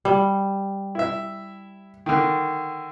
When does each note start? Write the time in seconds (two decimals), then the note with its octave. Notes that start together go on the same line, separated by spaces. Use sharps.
0.05 G3
0.95 E4 E5
2.06 D3 D#3